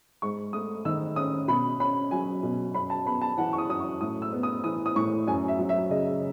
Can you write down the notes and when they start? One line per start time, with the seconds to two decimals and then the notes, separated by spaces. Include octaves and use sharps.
0.22 G#2 C#6
0.53 A3 D#6
0.85 D#3 E6
1.16 C#4 D#6
1.48 B2 B5
1.80 C#4 B5
2.11 F#3 G#5
2.43 B2
2.74 F#2 B5
2.90 A5
3.06 B3 B5
3.21 A5
3.38 E3 F#5
3.53 C#6
3.58 D#6
3.69 F#2 D#6
3.80 C#6
4.01 A2 D#6
4.22 E6
4.33 B3
4.43 D#6
4.64 E3 D#6
4.86 D#6
4.95 A2 C#6
5.27 F#2 G#5
5.48 E5
5.59 F#3
5.69 E5
5.90 C#3 D#5